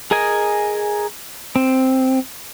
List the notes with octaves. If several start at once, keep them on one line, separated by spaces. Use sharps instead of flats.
G#4 A#4 D#5 G#5
C4